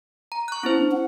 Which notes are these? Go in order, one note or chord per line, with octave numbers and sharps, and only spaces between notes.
A#5
C#6 F#6
B3 C#4 E4 C5
D4
F#5